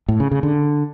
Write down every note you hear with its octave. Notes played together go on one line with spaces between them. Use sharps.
A2
C#3
C#3
D3